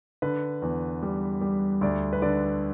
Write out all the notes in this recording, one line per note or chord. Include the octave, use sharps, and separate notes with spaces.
D3 B4
E2
G3
G3
D2 D5
B4
D3 D5